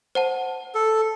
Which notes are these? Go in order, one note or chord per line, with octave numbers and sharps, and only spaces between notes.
C5 F#5 A5
A4